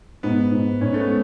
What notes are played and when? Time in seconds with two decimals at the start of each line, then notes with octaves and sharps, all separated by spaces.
0.23 G#2 B3
0.52 G#2
0.81 G#2 C#4
0.94 A3
1.00 B3